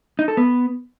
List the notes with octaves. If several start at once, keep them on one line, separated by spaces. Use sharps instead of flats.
D#4
A4
B3